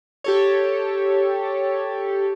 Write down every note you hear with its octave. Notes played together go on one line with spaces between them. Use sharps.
G4 A4 C#5